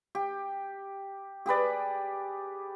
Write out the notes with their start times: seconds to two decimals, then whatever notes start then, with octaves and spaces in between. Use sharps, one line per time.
0.15 G4
1.46 G4 G#4 B4 D5